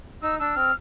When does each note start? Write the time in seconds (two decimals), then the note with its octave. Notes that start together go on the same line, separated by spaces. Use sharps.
0.23 D#4 E6
0.39 D4 E6
0.56 C4 F6